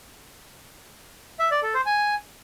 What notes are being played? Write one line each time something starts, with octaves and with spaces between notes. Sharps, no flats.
E5
D5
A4
C5
G#5